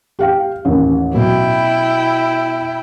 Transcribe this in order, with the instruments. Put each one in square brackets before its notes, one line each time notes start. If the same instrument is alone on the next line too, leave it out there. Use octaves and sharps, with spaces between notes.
[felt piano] G4 F5 G5
A1 D#2
[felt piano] B2 F#3 [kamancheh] E4 G5